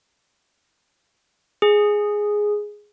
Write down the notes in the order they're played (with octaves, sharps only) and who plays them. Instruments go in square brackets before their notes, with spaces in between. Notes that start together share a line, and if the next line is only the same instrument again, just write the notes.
[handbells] G#4